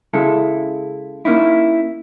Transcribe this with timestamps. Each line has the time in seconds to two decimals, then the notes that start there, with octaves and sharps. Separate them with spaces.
0.14 C#3 G#3 E4 A4
1.25 A#3 C#4 D#4 E4